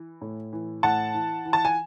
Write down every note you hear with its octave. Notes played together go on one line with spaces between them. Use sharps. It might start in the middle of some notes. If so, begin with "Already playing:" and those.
Already playing: E3
A2
E3
A2 F#5 A5
E3
E3
A5
G#5